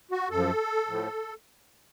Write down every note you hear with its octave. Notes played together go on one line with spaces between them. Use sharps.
F#4
F#2 F3 A4
A2 F3